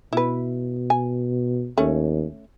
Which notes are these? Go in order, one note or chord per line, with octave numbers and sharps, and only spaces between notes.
B2 E4 B4
G#5
D#2 A3 C#4